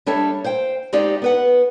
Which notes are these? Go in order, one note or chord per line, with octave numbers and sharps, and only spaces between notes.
G3 D4 A4 C#5 E5
C5 F5 G5
G#3 C4 D#4 G4 D5 F5
B3 B4 F#5